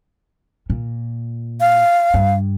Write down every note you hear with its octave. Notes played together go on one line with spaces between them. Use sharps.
A#2
F5
G2